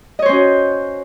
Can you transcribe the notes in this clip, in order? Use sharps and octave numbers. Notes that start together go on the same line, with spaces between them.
C#4 F#4 C5 C#5 D#5